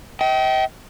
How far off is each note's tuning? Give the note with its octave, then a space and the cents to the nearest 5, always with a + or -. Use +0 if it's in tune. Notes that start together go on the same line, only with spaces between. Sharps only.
D#5 +40 G5 -25